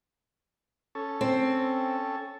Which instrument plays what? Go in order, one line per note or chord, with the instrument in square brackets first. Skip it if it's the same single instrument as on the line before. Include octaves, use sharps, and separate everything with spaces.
[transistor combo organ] C#4 A4
[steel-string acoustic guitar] C4